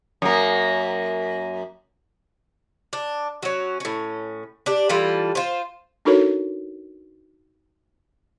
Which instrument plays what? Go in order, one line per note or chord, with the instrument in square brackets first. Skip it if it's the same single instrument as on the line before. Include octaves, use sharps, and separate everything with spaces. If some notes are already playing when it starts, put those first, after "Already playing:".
[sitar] F#2 A#3
[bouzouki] D4
F#3 C#4
A2 C#4
D4 G4
E3 G3 F4 A4
F4 C5
[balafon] D4 D#4 F#4 A4 A#4 C#5